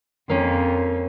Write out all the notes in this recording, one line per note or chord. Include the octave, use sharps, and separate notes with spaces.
F2 A#3 C#4